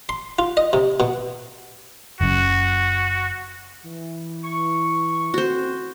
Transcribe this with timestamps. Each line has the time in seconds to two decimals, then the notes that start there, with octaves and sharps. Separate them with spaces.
0.09 C6
0.39 F4
0.57 D#5
0.73 C3
1.00 B2
2.21 F#1 F#2 F#4
3.85 E3
4.45 C#6
5.34 A1 C4 F#4 C5